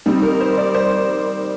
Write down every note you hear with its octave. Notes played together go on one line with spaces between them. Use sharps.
D#3 G3 C4 D#4
A#4
C5
D5
C5